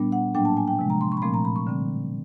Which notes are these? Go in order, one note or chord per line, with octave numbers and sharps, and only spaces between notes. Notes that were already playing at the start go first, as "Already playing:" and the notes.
Already playing: A#2 G3 B3 D4
F#5
A2 F#3 A#3 D4 G5
A5
G#5
G5
C3 F3 G#3
A#5
C6
C#6
B5
A#2 F3 A3 C4 C6
A#5
B5
C#6
D3 G3 C4